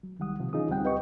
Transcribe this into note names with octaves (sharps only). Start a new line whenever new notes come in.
F#3
C2 D#3 G3 F#5 D#6
C3 D#3 F3
E3 C#4 D#4 F4 G#4 D#6
D2 G3 C4 F#5 G5
G4 B4 D#5 G5 C#6